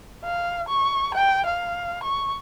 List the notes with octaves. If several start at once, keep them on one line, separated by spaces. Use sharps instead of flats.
F5
C#6
G5
F5
C#6